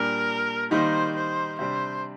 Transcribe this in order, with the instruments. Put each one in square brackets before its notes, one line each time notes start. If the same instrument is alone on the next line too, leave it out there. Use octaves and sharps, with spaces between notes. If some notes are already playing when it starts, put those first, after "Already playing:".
Already playing: [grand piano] A#2 G3 D4 [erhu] A#4
[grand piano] D#3 G3 A#3 D#4 [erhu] C5
[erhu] C5
[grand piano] C3 G3 D4 [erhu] C5